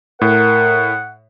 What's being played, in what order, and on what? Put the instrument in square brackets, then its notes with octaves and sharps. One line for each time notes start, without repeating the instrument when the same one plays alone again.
[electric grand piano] A2 [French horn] A#4 [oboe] F#5